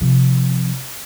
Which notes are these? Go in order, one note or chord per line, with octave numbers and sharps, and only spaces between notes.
C3 F3